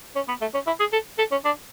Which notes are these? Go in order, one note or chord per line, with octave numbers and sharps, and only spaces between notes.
C#4
B3
A3
C#4
E4
G#4
A4
A4
C#4
D4